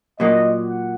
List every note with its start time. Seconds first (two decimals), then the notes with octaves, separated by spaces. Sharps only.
0.19 A#2 F#3 A#3 D#5
0.65 F#5